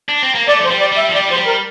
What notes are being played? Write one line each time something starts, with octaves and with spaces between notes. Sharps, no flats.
D4
C4
A#3
A3 D5
F3
C5
G3
D5
G3 E5
F3
G3 D5
F3 C5
G3
A#4